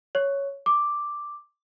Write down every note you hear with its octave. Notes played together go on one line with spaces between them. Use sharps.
C#5
D6